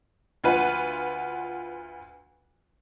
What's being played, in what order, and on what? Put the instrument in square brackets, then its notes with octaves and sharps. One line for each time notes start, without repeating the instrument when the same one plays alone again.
[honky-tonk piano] D2 F4 B4 F#5